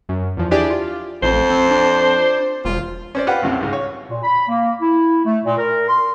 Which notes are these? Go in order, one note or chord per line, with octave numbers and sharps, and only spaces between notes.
F#2
E2 F3
D4 E4 G4 G#4 D5
F4
A1 F2 C5
C4
D4
E1 F4
C#4 C5 D5
F4 G4 B4 C5 F#5
C2 F#2 C3
C#2 G#2
C#5
A#2
B5
A#3
E4
A3
A#2
A#4
C6